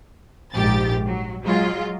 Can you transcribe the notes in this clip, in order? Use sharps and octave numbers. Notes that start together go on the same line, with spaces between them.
A#1 G#2 G4 A6
F#3
F#3 G#3 F4